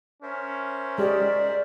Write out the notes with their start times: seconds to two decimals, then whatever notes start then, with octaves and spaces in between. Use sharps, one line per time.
0.23 C#4 A#4 C5 E5
0.98 G#3 G4 D5